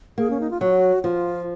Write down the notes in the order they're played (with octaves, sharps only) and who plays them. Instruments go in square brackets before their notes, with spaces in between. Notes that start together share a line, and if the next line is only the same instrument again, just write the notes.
[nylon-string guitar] A#3 [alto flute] G#4
[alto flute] C#4
D#4
F4
[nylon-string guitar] F#3 [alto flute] F#4
[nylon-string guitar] F3 [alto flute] F4